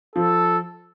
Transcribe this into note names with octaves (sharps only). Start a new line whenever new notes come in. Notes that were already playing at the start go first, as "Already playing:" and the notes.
F3 A4